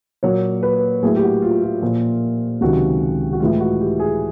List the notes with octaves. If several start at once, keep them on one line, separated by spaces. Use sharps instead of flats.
A#2 F#3 A#3 C#5
B4
A2 F#3 A#3 G#4
G4
F#4
F4
F4
A#2 F3 A#3
C#2 C3 D#3 F#3 F#4
F#4
A2 E3 G#3 F4
F#4
G4
G#4